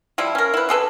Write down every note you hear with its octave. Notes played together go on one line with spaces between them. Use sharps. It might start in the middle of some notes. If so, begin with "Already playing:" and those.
F3 G3 E4
C#4 A#4
E4 B4
C3 G#4 A4 B4